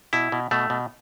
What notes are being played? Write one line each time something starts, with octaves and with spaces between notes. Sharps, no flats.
B2 E4
B2
B2 A3
B2